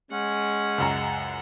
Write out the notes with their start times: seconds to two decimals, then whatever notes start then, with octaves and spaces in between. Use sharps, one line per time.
0.11 G#3 C#4 F#5
0.78 C#2 F#2 A#5